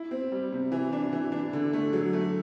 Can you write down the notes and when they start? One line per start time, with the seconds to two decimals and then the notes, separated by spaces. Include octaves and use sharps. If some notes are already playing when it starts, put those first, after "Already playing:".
Already playing: E4
0.11 C4
0.32 G3
0.52 C3
0.72 E3
0.93 D4
1.13 E3
1.32 D4
1.53 D3
1.73 A3
1.93 F#3
2.13 A3